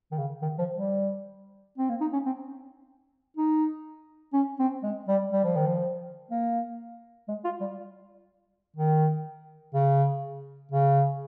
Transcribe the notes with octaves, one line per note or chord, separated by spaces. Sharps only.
D#3
C#3
D#3
F3
G3
C4
A#3
D#4
C#4
C4
D#4
C#4
C4
G#3
G3
G3
F3
D#3
F3
A#3
G#3
F4
G3
D#3
C#3
C#3